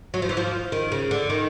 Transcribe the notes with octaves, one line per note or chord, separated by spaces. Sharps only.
F#3
F3
E3
F3
D#3
C#3
D3
D#3